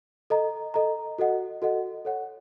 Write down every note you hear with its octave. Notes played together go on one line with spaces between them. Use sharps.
A4 D#5 A#5
A4 D#5 A#5
F#4 A4 D#5 F#5
F#4 A4 D#5 F#5
A4 C#5 F#5